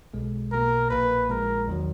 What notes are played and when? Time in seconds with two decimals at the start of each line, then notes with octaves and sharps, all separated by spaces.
0.14 B1 B2 G#3
0.52 B1 B2 A#3 A#4
0.90 A#1 A#2 A#3 B4
1.30 A#1 A#2 G#3 A#4
1.68 E2 D#3 F#3